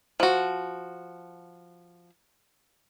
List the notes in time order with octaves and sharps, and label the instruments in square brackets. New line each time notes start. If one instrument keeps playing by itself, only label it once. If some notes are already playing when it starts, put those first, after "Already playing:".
[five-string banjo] F3 F#4